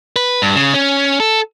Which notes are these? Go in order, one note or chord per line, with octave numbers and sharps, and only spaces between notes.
B4
G2
C#3
C#4
A4